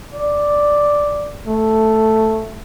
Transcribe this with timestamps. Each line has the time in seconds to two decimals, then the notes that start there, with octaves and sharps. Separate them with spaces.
0.15 D5
1.47 A3